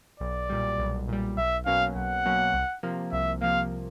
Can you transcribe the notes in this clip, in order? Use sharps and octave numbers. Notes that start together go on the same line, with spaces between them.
B1 D5
A#2 G3
B1
A#2 G3
B1 E5
B2 F#3 A#3 C#4 F5
B1 F#5
B2 F#3 A#3 C#4
C2
C3 F3 A#3
C2 E5
C3 F3 A#3 F5